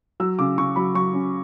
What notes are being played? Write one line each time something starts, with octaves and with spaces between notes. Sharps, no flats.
F#3 E6
C#3 D6
C#3 C#6
F#3 B5
F#3 C#6
C#4